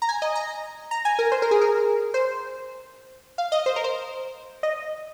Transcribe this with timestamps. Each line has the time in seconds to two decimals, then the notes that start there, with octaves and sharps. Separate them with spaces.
0.02 A#5
0.09 G#5
0.22 D#5
0.35 A#5
0.91 A#5
1.05 G#5
1.19 A#4
1.32 C5
1.42 A#4
1.51 G#4
1.61 A#4
2.14 C5
3.38 F5
3.52 D#5
3.66 C5
3.76 A#4
3.84 C5
4.63 D#5